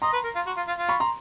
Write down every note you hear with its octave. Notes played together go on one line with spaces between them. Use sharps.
D#5 A#5 C6
B4
A#4
F4
F#4
F4
F4
F4
B5 C#6
A#5 C6